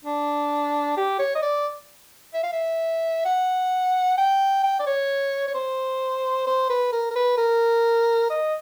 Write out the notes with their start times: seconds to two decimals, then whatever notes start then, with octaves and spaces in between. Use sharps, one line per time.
0.04 D4
0.97 G4
1.19 C#5
1.35 D#5
1.42 D5
2.34 E5
2.43 F5
2.52 E5
3.25 F#5
4.18 G5
4.63 G5
4.79 D5
4.87 C#5
5.47 C#5
5.54 C5
6.47 C5
6.69 B4
6.92 A#4
7.11 A#4
7.15 B4
7.38 A#4
8.30 D#5